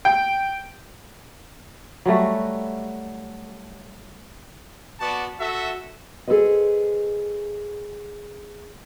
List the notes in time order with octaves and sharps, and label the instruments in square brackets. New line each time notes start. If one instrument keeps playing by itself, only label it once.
[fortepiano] G5
[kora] F#3 G3 A3 F#4
[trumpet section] B3 F#4 D5 A5
F#4 A4 E5
[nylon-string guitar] G#4 A4 B4 C5 D#5